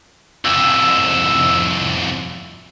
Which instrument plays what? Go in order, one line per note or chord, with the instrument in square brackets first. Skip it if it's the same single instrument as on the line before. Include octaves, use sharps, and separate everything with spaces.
[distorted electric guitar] C2 F2 [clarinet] E6